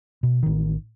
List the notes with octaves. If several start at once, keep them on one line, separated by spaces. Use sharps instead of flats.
B2
A1 D#3